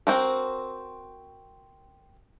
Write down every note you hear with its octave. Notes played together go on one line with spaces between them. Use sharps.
C4 F#4 A#4